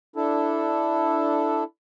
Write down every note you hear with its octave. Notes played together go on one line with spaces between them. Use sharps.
D4 E4 A4